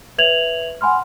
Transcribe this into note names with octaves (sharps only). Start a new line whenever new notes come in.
B4 C#5 E5 G#6 F7 F#7
F#5 G#5 B5 C6 F6